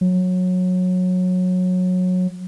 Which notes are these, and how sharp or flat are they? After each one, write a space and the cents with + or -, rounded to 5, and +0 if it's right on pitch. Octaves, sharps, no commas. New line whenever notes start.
F#3 -20